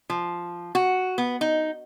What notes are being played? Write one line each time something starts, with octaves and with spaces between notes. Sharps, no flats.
F3
F#4
B3
D#4